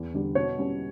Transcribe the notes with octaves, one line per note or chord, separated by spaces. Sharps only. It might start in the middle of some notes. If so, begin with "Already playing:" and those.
Already playing: E2
D3 G3
B2 C#5
G3 C#4